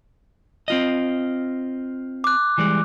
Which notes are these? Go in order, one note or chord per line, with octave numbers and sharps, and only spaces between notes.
C4 F4 D#5
D6 F#6
E3 G3 G#3